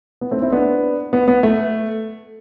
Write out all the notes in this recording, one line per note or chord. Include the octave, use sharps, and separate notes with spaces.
B3
A3 C4
C4 E4
B3 D4
B3
B3
A3